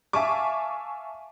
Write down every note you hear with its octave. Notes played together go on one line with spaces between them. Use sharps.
E5 F5 G#5 A5 C#6 D6